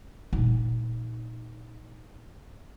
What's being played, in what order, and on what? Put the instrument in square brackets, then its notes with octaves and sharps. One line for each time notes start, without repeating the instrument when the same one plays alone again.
[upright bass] A#2 D#4